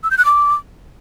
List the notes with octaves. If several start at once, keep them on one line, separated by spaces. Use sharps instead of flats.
E6
G6
F#6
D6